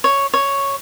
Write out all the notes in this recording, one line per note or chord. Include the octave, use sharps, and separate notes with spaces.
C#5
C#5